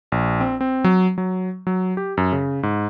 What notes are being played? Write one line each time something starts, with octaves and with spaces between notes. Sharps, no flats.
A#1
C4
C4
F#3
F#3
F#3
G4
F#2
C#3
G#2